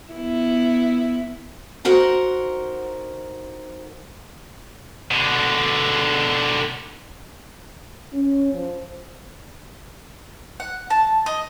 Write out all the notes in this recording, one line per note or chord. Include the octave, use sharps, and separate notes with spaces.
B3 E4
D#4 F#4 A#4 C5 F#5
B2 D3
C#4
F3
F#5
A5
D#5